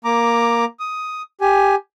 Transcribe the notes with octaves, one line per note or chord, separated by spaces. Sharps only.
A#3 A#5 D6
D#6
G4 G#5